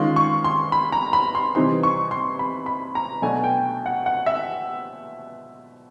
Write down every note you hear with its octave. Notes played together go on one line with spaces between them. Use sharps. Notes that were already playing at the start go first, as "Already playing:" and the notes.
Already playing: D#3 G#3 C#4 F4 C6
C#6
C6
B5
A#5
B5
C6
C3 E3 G3 C4 D#4 C6
C#6
C6
B5
B5
A#5
B2 F#3 A3 D4 G#5
G5
F#5
F#5
E5